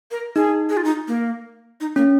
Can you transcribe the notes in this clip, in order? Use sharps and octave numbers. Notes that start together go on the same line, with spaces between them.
A#4
D#4 G#4
G#4
F4
D#4
A#3
D#4
A#3 C#4